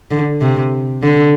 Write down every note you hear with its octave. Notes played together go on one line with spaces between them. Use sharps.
D3
C3
D3